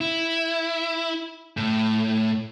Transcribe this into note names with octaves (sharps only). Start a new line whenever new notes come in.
E4
A2